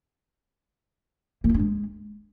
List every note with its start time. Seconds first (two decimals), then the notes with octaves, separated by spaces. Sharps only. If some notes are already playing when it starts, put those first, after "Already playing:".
1.44 A#3
1.49 F4
1.54 D4
1.59 G#3